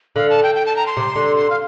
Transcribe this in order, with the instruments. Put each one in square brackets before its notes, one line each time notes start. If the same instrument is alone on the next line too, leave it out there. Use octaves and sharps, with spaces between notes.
[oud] D3 [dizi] F5
[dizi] A5
G5
G5
A5
A#5
C6
[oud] C3
D3
[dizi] C6
F5